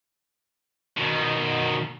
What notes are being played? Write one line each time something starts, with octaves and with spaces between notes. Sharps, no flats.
B2 D#3